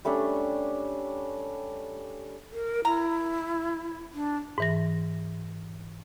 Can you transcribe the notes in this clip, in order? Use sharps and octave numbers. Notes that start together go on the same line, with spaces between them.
G3 A3 C#4 D4
A#4
E4 A#5
D4
G#2 E3 A#6